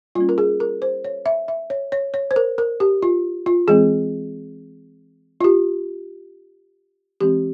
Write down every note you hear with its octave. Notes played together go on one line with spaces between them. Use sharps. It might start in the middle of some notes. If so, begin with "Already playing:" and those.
G3 A#3 C#4 F4
A#4
G#4
A#4
C5
C#5
E5
E5
C#5
C#5
C#5
C5
A#4
A#4
G4
F4
F4
E3 G#3 C4 G#4
F4
G4
E3 G#3 C4 G4